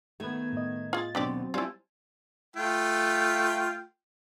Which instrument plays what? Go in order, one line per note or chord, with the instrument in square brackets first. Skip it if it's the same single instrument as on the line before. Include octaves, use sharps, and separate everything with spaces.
[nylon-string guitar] D#3 A3 [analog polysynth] B3 G#6
[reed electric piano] A2 D#5
[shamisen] F4 G#4 [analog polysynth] A6
[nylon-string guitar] D#2 B2 [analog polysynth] F#3 C4 [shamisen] D4 G4 D5
[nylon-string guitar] G3 C4 C#5 [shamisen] E4 F4 [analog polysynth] G#5 A5
[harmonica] A3 F4 G5